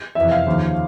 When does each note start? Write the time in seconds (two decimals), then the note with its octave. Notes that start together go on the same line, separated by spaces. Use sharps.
0.15 F2 C3 E3 E5
0.31 F5
0.47 D#2 C#3 F3